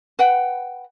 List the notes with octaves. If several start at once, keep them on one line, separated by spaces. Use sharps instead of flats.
B4 F#5 G5